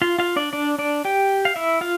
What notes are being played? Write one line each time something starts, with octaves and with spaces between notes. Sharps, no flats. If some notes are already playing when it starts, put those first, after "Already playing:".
F4 F5
F4 F5
D4 D5
D4 D5
D4 D5
G4 G5
F5
E4 E5
F4 F5